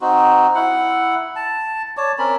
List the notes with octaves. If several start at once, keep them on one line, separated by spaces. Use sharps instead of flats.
C4 D#4 F#4
E4 F#5
A5
C#5 D5 A5
C4 C#4 A#4 B5